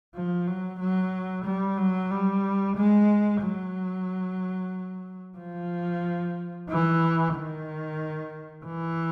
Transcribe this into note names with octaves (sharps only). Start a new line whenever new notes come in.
F3
F#3
F#3
G3
F#3
G3
G#3
F#3
F3
E3
D#3
E3